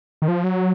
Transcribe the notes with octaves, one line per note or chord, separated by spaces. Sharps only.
D#3
F3
F#3